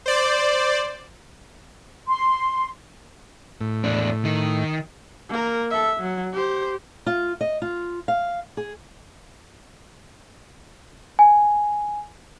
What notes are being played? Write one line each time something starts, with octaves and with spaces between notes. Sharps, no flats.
C5 D5
C6
A2
E2 D4
D#3
A#3 A#4
A4 E5
F#3
G4 C5
F4
D#5
F4
F5
G#4
G#5